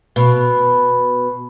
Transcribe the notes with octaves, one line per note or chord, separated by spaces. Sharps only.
B2